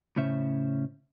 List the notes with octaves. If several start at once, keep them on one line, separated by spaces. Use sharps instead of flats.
A2 C#3 C#4 C5 E5